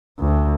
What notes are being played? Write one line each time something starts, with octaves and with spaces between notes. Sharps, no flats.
D2